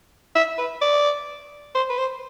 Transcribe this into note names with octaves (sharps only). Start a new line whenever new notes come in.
E5
B4
D5
C5
B4
C5